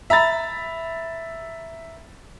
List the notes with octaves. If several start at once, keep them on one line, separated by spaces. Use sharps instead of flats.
E5 A#5 B5 A6